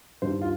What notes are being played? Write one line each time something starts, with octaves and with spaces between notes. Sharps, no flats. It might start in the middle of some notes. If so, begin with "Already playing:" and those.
G2 D#3 G3 C5
F4